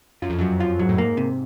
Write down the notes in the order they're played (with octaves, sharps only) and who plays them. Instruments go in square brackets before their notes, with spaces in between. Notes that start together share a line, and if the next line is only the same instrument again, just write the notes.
[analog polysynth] F#2 [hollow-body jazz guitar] F4
[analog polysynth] F2
[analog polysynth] F#2 [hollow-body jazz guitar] F#3
[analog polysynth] F2 [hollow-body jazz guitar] F4
[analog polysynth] G#2 [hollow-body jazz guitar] F#3
[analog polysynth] A2
[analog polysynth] G#2 [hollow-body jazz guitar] A#3
[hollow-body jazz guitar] C3